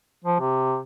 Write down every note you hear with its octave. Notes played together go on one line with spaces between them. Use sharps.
F3
C3